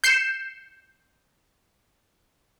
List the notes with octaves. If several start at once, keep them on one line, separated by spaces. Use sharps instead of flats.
G6 C7 C#7 E7